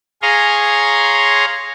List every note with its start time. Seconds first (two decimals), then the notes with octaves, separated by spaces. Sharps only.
0.22 G#4 C#5 F5 G#5 A#5 C6